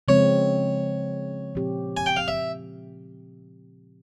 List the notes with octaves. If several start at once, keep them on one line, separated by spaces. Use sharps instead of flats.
C#3 F3 G#3 C4 C#5
A#2 F3 C4 G4
G#5
G5
F5
E5